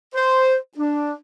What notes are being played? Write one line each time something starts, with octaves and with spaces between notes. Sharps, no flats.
C5
D4